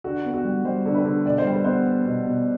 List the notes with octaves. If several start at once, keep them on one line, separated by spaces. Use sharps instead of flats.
D3 F#4
B3
F#4
G3
G3 C5
D3
B4
D3
B2 D5
C5
G3
B4
B3 C5
B3
B2
B2